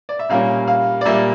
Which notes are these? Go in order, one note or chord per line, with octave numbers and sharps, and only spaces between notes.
D5
E5
A#2 G3 A#3 C#4 F5
F5
D5
A#2 G3 A#3 E5
D5